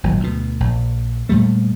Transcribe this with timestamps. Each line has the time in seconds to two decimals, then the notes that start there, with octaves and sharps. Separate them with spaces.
0.04 G#1 A#2 F#3
0.20 D2 B2
0.60 A#1
1.29 F2 A#2 G3 A3